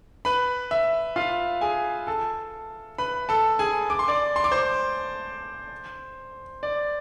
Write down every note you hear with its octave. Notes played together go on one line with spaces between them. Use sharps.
B4 B5
E5
F4 F5
G#4 G#5
A4 A5
B4 B5
A4 A5
G#4 G#5
D6
C6
D5 D6
C6
D6
C5 C6
D5